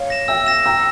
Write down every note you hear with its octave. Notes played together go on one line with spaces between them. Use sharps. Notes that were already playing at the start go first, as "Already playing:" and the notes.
Already playing: C#5 F5
A#6 E7
E5 G5 E6
A#6 E7
G5 A#5 E6